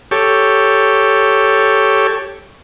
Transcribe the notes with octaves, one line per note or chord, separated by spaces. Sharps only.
G4 A4 C#5